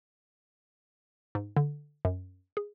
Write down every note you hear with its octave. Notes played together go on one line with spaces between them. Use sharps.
G#2
D3
F#2
G#4